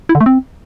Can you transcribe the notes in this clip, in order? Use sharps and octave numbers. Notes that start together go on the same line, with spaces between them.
E4
D3
A3
C4